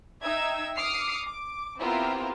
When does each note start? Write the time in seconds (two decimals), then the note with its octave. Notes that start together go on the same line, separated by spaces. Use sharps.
0.22 D#4 E5 G5 E6 G#6
0.77 D6 D#6 F6 C7 C#7
1.25 D6
1.81 B3 C4 E4 F4 G4 A#4